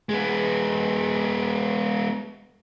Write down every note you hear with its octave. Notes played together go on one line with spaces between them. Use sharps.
G#3 B3